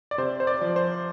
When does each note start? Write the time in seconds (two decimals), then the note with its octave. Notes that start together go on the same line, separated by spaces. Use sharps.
0.11 D5
0.18 C3 C5
0.40 C5
0.47 D5
0.61 F3
0.76 C5